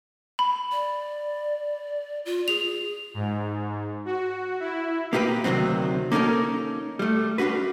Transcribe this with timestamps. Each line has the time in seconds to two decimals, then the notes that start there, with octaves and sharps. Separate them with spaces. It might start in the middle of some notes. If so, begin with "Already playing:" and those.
0.39 B5
0.71 D5
2.25 F4
2.48 G#4 F7
3.14 G#2
4.05 F#4
4.60 E4
5.13 A#3 D#4 G4 A4 B4
5.44 D2 C3 D#3 F#3 C4
6.12 A#3 C#4 D#4 A4 A#4
6.99 G3 A3
7.38 C#4 D4 F4 F#4 B4